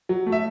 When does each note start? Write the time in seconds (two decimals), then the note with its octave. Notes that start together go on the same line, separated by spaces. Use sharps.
0.09 F#3
0.26 A3
0.32 E5